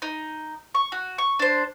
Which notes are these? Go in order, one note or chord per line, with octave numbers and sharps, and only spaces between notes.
D#4
C#6
F#4
C#6
D4 C5